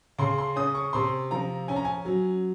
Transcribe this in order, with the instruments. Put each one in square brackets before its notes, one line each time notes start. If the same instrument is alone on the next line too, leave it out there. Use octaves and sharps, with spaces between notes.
[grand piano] C#3 C6
C6
C#4 D#6
C#6
C3 C6
F3 A#5
C#4 G#5
A#5
G#5
F#3